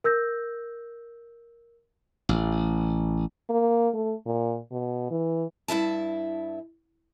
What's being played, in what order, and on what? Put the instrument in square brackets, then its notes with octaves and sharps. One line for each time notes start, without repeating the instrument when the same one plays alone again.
[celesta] A#4 E6 G6 A#6
[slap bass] A1
[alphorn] A#3
A3
A#2
B2
E3
[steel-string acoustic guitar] G2 E4 E5 A5